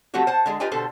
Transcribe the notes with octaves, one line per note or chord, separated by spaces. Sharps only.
F3 F#3 A3 C4 F#4 G4
C5 F#5 A5
D3 G#3 G#4
F4 G4 B4 D#5 G5 G#5
B2 D3 A4 C5